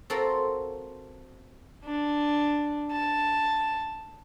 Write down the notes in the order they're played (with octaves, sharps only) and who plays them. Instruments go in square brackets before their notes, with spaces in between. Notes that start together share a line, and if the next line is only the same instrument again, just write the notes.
[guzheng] C4 F4 F#4 A4 A#4
[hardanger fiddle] D4
A5